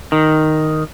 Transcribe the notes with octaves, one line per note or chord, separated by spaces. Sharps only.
D#3